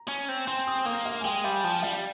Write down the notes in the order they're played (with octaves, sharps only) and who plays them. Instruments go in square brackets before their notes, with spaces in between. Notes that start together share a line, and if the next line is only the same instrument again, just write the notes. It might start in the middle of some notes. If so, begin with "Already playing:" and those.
Already playing: [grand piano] A#5
[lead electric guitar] C#4
C4
[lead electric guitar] C4 [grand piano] G#5 C6
[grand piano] C6 D#6
[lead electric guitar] A#3 [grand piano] C6 D#6
[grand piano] F5
G#5
[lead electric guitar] G#3 [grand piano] G5
[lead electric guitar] G3 [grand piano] F5 G#5
[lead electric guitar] F3 [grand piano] G5
[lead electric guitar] G3 [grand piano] F5